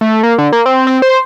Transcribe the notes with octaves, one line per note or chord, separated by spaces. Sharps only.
A3
A#3
D3
A#3
C4
C4
C5